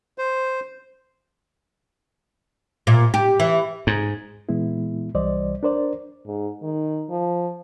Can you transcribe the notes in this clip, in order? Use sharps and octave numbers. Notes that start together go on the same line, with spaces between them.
C5
A#2
G4
E3
G#2
A#2 E3 G#3 B3 E4
C2 E3 G3 C5 D5 D#5
D4 A#4 C5 D5
G#2
D#3
F3